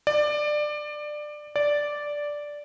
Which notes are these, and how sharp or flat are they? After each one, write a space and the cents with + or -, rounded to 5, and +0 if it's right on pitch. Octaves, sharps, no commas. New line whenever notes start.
D5 +20
D5 -5